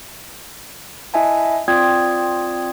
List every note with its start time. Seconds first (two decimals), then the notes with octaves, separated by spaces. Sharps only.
1.14 E4 D#5 E5 G#5 A5
1.68 C4 F4 D5 G5 D#6 G#6